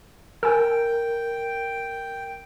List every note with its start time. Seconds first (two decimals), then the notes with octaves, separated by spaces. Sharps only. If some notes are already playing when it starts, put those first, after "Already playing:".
0.43 A#4 G5 G#5 E6